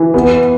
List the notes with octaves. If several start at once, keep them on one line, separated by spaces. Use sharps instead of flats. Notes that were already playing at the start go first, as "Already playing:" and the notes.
Already playing: E3
B3